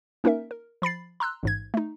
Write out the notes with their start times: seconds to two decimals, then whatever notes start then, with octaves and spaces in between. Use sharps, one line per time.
0.24 A#3 C#4 D#4 A#4 E5
0.51 A#4
0.82 F3 B5 A6 C7
1.20 A#5 C6 E6 F#6
1.43 A1 G#2 G#6
1.74 A3 D#4